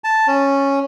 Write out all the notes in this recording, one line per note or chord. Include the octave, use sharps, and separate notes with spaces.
A5
C#4